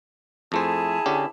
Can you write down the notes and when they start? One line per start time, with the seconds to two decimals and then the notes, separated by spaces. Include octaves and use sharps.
0.52 F2 A3 E4 G#4 C5 A5
1.06 D3 C#4 G4